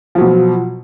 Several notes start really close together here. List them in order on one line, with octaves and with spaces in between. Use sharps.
F3 F#3 B2